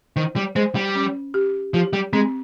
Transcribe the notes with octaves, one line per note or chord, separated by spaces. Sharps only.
D#3 C5
G3
G#3 C5
G3
C#4
G4
F3 G4
G3
G#3 C4